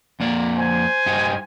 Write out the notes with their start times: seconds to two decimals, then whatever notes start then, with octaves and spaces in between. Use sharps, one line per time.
0.20 F2 A#3 D5
0.57 C5 G#5
1.06 G2 D#4 G4